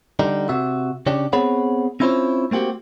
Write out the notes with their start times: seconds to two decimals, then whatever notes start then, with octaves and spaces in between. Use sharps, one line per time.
0.19 D3 G3 D#4
0.49 C3 F#4 E5
1.06 C#3 C#4 D4 G4
1.33 B3 C4 G#4 C#5 F#5 B5
2.00 C4 C#4 E4 F4 C5 C#5
2.51 A3 A#3 C4 F#4 G4